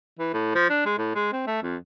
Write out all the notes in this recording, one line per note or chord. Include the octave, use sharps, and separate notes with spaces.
E3
A2
F3
D4
G#3
A2
G#3
C4
A3
F2